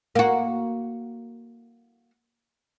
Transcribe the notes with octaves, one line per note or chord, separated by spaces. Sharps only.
A#3 F#4